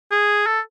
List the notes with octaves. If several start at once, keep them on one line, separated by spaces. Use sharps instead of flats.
G#4
A4